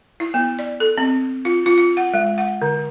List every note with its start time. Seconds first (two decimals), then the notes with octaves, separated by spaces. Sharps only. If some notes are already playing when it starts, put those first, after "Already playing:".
0.20 E4
0.34 B3
0.59 D5
0.80 A4
0.98 C4
1.45 F4
1.66 F4
1.78 F4
1.97 F#5
2.14 G#3
2.38 F#5
2.62 D3